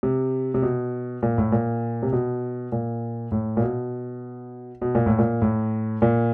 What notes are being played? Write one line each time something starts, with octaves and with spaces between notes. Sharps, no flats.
C3
C3
B2
A#2
A2
A#2
C3
B2
A#2
A2
A#2
B2
B2
A#2
A2
A#2
A2
A#2